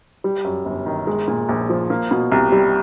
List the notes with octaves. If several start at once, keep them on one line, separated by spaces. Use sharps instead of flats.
G3
F#2
G1
D#3
G#3
A#2
A#1
F3
A#3
B2
C2
G3